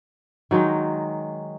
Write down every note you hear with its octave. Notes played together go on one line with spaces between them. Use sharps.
D#3 F#3 G#3 D#4